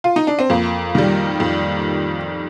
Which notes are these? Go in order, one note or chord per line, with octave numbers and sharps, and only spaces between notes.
F4
D#4
D4
C4
F2 A#3
D#3 G3
F2